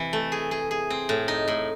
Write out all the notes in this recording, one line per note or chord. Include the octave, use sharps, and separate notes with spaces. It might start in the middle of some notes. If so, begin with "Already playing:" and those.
Already playing: C3 E3
A3
G#4
G#4
G#4
C4
A2
D#4
A2